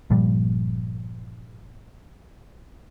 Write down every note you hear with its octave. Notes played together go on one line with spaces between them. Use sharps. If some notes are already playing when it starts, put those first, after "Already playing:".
G1 A#2 F3 G3